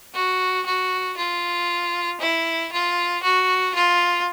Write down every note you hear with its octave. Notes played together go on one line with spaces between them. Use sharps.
F#4
F#4
F4
E4
F4
F#4
F4